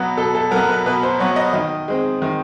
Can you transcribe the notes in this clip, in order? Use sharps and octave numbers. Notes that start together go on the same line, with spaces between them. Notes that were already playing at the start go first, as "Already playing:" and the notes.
Already playing: B2 F#3 B3
B2 A4
A4
F#3 B3 A#4
B4
B2 B4
C5
F#3 B3 C#5
D#5
D#3 D#5
G#3 C4
D#3